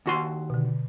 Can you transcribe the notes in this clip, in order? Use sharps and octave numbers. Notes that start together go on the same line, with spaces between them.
D#2 F#4 C6
B2 D3